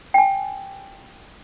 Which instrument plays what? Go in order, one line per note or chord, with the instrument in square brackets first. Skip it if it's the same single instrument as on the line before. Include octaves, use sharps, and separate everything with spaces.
[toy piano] G5 G#5